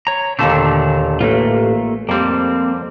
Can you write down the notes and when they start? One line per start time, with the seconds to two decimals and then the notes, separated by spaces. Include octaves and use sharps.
0.07 C#5 A#5
0.39 D#2 A#2 D3 A3 A5
1.21 A1 A3 A#3 F4
2.09 F2 G3 A#3 C4